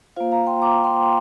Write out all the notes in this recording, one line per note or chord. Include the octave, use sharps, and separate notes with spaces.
A#3 F4 C5 F5
F5 A#5
G5 C6
A#5 D6
G5 C6